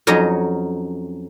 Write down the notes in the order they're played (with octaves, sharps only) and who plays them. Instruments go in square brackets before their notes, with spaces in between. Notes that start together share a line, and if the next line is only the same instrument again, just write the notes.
[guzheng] F2 F#3 C#4 D#4 D#5